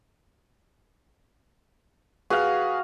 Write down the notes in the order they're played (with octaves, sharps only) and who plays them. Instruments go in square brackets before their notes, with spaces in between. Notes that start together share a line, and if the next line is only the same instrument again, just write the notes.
[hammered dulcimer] F#4 F5 [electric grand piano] G#4 B4